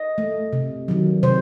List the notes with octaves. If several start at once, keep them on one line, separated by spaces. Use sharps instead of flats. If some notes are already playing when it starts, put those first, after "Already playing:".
Already playing: D#5
A3
C3
D#3 F#3
C3 C5